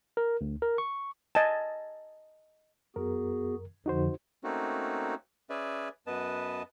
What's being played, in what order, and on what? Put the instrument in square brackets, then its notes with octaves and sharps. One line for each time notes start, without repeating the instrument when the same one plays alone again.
[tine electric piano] A#4
D2
A#4
C#6
[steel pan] D#5 G#5 A5
[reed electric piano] F#2 A#4 [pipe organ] B3 F#4 G#4
[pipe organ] F2 D3 F3 [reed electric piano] D#4 F#4 C5
[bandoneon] A3 A#3 C4 C#4 D#4 F#4
C#4 G#4 B4 D5 E5
F#2 B3 B4 D#5 A5